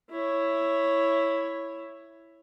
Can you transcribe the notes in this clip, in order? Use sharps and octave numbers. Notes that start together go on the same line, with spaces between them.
E4 C#5